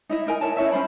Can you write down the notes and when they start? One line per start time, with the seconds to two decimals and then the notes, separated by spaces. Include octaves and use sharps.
0.09 D#4 E4 D#5
0.27 D#4 A#4 G#5
0.41 E4 A#4 C#5 A5
0.57 C#4 E4 C#5 E5
0.72 C#4 D4 C5 B5